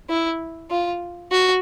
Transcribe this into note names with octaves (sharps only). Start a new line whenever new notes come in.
E4
F4
F#4